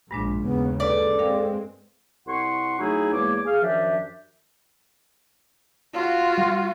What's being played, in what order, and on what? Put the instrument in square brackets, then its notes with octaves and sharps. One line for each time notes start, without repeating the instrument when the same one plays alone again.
[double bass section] A#1 A#2 [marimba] G2 G#3 D4
[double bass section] D#2 C#3 [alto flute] B3
[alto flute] A4 [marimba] B4 [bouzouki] D5
[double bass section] G#3 C4 [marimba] A#4 F5 G5
[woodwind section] C2 F#5 C6 C#6
F#3 A3 D#4 E4 G#4
E2 G#3 A#3 C#5 D6
G#4 F5
F#2 D#3 F3 D4 G4 E5
[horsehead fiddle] F4 F#4
[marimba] G3